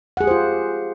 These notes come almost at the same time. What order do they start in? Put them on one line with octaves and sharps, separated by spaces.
F#5 G#4 G4 C5 F4